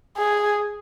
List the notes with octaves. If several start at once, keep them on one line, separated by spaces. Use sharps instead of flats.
G#4